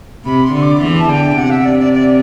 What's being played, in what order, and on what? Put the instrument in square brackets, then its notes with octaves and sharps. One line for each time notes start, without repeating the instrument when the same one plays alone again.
[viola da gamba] C3 [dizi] B5
[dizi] C6
[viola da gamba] D3
[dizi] D6
[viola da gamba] E2 E3
[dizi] A5
[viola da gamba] D3 [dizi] G5
[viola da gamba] C3 [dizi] F#5
[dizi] E5
D5
D5
D5